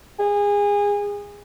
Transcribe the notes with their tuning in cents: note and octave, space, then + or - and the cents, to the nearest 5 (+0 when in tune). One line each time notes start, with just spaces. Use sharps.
G#4 -25